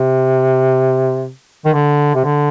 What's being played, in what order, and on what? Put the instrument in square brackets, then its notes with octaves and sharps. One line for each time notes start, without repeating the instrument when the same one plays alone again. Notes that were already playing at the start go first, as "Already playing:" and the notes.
Already playing: [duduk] C3
D#3
D3
C3
D3